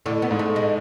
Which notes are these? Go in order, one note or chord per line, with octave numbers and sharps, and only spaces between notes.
A2 D3
B3
G#2
A3
G#3